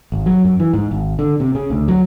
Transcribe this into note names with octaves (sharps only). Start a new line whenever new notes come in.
G#1
F#3
F#2
E3
G#2
G#1
D3
C3
C#3
D2
F#3